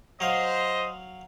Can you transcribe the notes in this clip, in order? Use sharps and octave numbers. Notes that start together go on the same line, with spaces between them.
F#3 C5 D#5 F5